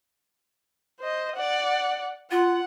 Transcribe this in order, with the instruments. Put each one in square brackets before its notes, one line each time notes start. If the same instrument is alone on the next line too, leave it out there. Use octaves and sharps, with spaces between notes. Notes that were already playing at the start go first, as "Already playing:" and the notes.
[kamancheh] C5 D#5
D5 F#5
[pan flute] F4 [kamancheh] F#5